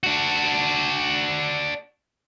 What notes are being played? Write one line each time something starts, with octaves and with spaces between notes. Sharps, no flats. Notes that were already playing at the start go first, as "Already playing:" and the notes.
D4 F#4